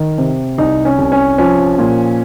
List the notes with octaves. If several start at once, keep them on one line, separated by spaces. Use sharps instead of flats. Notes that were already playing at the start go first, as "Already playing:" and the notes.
Already playing: D#3
C3
C2 D#4
C#4
C2
C#4
F3 C#4
A#2